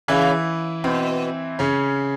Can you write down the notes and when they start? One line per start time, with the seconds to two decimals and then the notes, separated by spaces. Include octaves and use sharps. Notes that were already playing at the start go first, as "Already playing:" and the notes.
0.08 C#3 E3 E4
0.84 B2 C4
1.59 C#3 C#4